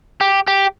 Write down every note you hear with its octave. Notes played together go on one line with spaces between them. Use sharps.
G4
G4